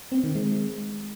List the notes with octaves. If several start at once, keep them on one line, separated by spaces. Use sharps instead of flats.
C4
D#3
G#3